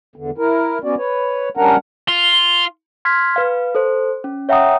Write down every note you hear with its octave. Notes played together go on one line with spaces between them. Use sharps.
E2 D3
E4 A#4
B3 C#4 F#4 D5
B4 C#5
G3 C#4 D4 A#4 F#5 A#5
F4
C6 F6 G#6 B6
B4 F5
A4 C5
C#4
C#5 E5 F#5 G5 A#5 D#6